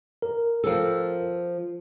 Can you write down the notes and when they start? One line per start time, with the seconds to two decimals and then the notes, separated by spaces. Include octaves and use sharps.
0.22 A#4
0.64 F3 C4 A4